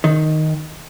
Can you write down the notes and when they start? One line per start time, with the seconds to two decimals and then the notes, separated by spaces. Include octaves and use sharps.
0.04 D#3